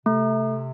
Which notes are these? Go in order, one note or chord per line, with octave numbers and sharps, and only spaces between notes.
C3 A3